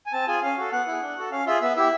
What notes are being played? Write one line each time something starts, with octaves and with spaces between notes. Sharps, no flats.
G#5
C4 A5
F4 G#4 G#5
C#4 F5
F#4 A4
B3 F#5
E4 G#4
D4
F#4 A4
C#4 F5
F4 G#4 E5
B3 E5
E4 G4 E5